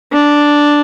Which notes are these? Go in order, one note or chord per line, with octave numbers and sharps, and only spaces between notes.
D4